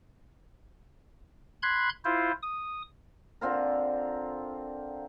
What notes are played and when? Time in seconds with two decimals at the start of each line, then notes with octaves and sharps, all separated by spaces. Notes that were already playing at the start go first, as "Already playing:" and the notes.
1.63 B5 C6 F#6 G#6
2.05 E4 F4 C5
2.43 D#6
3.41 D3 C4 F4 A#4